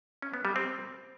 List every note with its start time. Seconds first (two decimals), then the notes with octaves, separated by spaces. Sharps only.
0.22 C#4
0.34 B3
0.45 G3
0.56 C4